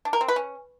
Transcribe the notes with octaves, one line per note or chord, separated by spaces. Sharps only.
D4
A#4
C4
B4
C#4